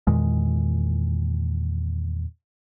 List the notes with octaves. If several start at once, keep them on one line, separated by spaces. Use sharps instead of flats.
E2 A#2 D#3 G#3